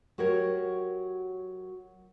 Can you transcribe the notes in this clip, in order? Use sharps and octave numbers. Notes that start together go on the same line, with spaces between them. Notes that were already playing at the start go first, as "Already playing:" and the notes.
F#3 F#4 G4 A#4 C#5